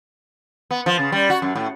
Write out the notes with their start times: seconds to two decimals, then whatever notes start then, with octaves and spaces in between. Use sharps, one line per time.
0.71 B3
0.86 F3
0.99 C#3
1.12 G3
1.30 F#4
1.42 F#2
1.55 A2